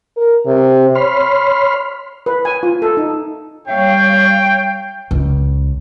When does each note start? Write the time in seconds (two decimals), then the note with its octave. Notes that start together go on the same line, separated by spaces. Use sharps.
0.17 A#4
0.46 C3
0.95 C#5 B5 C6 F6
2.26 B4
2.45 G#5
2.63 F4
2.82 A4
2.97 D#4
3.68 G3 C#5 F5 G5
5.11 C#2